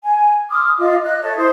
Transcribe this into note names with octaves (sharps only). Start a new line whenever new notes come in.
G#5
C6 D6 D#6 F6
F4 D#5 F5 D6
D#5 F#6
A4 C#5 E5
E4 C5 D#6